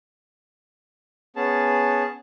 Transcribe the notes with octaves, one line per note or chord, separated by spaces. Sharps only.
B3 C#4 G#4 A5